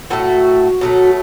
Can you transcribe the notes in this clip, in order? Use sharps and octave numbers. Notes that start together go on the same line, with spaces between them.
A2 F#3 A3 F#4
B2 F#3 A3